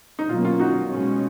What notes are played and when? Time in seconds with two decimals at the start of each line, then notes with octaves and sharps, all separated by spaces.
0.19 D#4
0.29 B2 F#3 A#3 C#4 F4
0.45 F4
0.60 D#4 F#4
0.90 B2 G#3 C#4